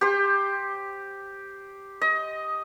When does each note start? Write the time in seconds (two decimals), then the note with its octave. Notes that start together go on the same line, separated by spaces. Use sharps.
0.01 G4 C5
2.01 D#5